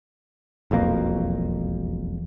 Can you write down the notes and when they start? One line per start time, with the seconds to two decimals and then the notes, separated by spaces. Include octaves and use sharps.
0.71 E1 B1 F2 A#3